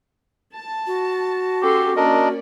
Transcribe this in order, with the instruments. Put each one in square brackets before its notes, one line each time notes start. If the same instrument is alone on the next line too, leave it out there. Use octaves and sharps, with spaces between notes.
[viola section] A5
[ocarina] F#4
[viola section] C#4 A4 C6 [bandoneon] G4
[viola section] A#3 C#4 D5 [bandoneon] D4 A#4 D#5